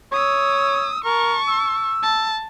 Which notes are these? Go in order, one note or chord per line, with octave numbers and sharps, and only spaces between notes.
C#5 D#6 E6
A#4 A5 C#6
E6
A5